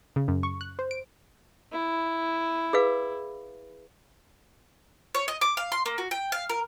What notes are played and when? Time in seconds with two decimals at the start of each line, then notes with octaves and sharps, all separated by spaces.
0.16 C#3
0.28 F#2
0.43 C#6
0.61 F#6
0.79 C5
0.91 D7
1.72 E4
2.73 G#4 B4 F5
5.15 C#5
5.28 D#5
5.41 D6
5.57 F5
5.72 C6
5.86 A#3
5.98 F#4
6.11 G5
6.32 F5
6.49 A#4